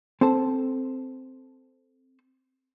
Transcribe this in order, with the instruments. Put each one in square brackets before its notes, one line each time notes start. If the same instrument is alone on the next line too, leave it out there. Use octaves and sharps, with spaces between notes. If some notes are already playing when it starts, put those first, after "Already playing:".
[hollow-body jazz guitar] C4 A4 C5 A5